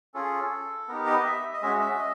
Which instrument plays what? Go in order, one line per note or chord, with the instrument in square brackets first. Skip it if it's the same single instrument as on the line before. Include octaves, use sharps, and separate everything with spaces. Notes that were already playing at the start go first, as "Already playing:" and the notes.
[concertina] C#4 F4 G#4 A4
B3 D#4 G4 A#4
D#5
E5
D#5
G#3 C#4 F#4 E5
E5
D#5